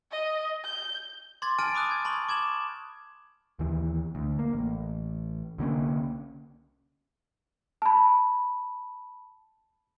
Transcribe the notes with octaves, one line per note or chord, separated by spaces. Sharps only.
D#5
G6
C6 D6 G#6 A6
G#5 A5 F6 A6 D7 D#7
B5 D6 D#6 F#6
G#6
A5 B5 C#6 F#7
D6 G#6 E7 F#7
D#2 E3
D2
A#3
A1
C2 D3 A#3 C#4
A5 B5